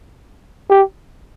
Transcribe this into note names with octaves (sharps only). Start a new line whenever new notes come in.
G4